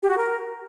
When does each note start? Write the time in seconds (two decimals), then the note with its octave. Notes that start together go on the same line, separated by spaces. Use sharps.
0.01 G4
0.09 F#4
0.16 A#4